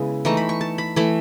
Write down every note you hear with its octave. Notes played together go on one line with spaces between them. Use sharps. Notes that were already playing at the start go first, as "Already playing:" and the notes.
Already playing: C#3 G#3 B3 E4
E3 A3 D#4 C#6
B5
C#6
A5
B5
E3 A3 E4 B5